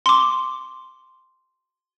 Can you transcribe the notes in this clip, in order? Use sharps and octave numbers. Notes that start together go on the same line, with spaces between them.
C6 D6